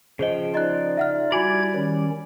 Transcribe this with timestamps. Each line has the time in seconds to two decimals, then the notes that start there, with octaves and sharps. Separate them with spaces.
0.19 C#3 F3 G#4 C5 D#5 G5
0.55 D#4 F4 D5 D#5 F#6
0.97 E5 F#5 F6
1.32 G3 E4 F#4 D5 G#5 B5 G#6
1.74 D#3 C#4 C#5